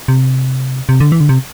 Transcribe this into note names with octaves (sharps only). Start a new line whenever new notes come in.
C3
C3
D3
E3
D3
C3